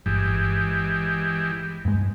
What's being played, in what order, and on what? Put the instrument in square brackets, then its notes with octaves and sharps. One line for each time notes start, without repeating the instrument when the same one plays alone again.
[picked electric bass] G1 [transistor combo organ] E3 G#3 G4
[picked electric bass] G2 G#3